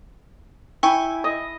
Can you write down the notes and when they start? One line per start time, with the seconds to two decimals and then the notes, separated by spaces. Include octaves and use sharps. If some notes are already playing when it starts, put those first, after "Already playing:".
0.83 E4 G5 G#5 C#6
1.24 D#5